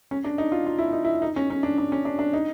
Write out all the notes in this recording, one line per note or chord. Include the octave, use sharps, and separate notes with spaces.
C#4
D4
D#4
F4
F4
E4
D#4
E4
D#4
C#4
C#4
D4
D4
C#4
D4
D4
D#4